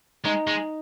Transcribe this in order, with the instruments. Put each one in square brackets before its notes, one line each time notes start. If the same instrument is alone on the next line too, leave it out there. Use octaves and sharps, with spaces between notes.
[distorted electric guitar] G#3 [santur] D#4
[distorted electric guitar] G#3